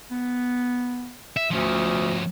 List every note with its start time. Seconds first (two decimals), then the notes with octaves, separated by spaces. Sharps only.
0.11 B3
1.37 E5
1.51 D2 F3 C#4